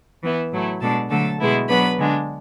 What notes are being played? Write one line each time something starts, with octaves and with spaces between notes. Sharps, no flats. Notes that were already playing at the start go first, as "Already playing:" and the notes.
E3 B3 E4
A2 F#3 A3 E4
B2 G#3 D4 A4 A5
D3 F#3 A3 A4 A5
B2 G#3 B3 E4
F#3 B3 D4 B4 B5
D3 G#3 D4